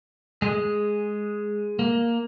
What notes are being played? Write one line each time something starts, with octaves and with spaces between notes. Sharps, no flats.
G#3 G#4
A#3